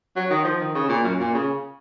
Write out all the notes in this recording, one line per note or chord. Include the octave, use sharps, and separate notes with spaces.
F#3
D#3
F3
D#3
C#3
A#2
F#2
A#2
C#3